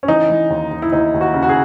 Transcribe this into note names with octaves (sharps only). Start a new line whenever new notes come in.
C#4
E3 D#4
E3
D#2
D#2
E4
D#2 D#4
D#2
F#4
C#3
F#4
G#4